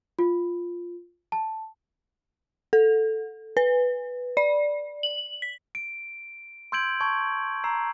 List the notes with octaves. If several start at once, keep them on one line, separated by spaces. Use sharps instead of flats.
F4
A5
A4
B4
D5
F#7
B6
D7
C6 E6 G6 G#6 D7 F#7
A5 C#6 G#6
A#5 E6 C7